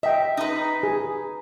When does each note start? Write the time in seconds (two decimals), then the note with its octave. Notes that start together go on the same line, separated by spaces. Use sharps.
0.03 D#5 E5 G5
0.37 D#4 B4
0.83 G#4